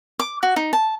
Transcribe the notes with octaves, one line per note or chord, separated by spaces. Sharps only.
D6
F#4
D#4
A5